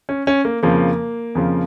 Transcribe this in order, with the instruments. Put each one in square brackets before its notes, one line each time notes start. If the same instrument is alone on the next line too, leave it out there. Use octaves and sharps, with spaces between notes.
[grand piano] C#4
C#4
A#3
F2 C#3 F3 A#3
F2 C#3 F3